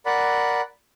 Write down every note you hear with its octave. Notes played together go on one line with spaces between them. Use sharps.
A#4 D5 F#5 B5